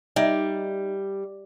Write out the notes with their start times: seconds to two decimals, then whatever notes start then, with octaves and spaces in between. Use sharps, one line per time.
0.16 G3 D#4 D5 E5